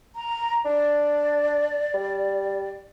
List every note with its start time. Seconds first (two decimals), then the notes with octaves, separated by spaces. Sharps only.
0.16 A#5
0.65 D4 D5
1.94 G3